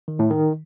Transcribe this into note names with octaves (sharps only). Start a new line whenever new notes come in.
D#3
A2
D#3